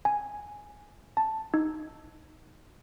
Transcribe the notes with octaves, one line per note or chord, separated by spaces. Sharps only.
G#5
A5
D#4